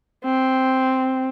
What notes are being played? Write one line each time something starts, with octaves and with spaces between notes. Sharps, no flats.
C4